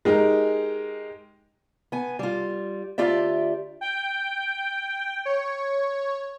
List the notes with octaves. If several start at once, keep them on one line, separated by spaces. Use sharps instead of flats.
G#3 D#4 G4 A#4
B3 G#5
G3 F4
D2 F4 G4 D5 E5
G5
C#5